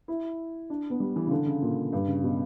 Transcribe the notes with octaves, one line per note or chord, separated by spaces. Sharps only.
E4
D4
B3
G3
E3
C#3
D3
C#3
A#2
G2
C#3
B2